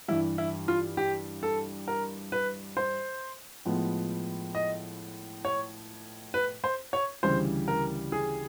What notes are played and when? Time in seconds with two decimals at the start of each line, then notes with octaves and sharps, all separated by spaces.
0.08 G2 E3 G3 E4
0.38 E4
0.68 F4
0.97 G4
1.43 A4
1.88 A#4
2.32 B4
2.77 C5
3.65 A2 F3 G#3 B3
4.55 D#5
5.45 C#5
6.34 B4
6.64 C5
6.93 C#5
7.23 D2 C#3 E3 G3 C5
7.68 A#4
8.12 G#4